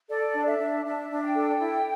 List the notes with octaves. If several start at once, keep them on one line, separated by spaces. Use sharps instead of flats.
A4 D5
D4
E5
D4
D4 E5
D4
G5
A4
E4